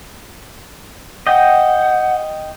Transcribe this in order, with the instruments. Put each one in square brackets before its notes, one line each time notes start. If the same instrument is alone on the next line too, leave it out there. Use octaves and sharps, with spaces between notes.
[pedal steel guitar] D#5 G5 [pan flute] F#5